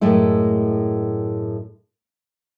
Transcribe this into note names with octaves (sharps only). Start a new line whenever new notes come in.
F#2 A2 G#3 A3 E4